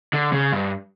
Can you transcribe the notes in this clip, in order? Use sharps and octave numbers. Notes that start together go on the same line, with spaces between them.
D3
C#3
G2